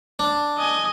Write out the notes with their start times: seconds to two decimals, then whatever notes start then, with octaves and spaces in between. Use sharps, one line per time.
0.19 D4
0.58 D#5 G#5